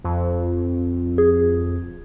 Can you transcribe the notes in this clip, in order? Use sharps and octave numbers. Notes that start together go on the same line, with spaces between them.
F2
G#4